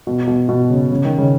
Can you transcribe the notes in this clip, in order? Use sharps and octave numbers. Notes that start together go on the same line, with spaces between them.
B2
B2
B2
C#3
C#3
D#3
C#3